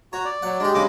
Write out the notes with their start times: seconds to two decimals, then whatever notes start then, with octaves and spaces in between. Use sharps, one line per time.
0.13 F#4 C#5 A#5
0.25 D5
0.42 F#3 F#5
0.60 G#3 D4 G4
0.74 G2 C#3 F#3 D6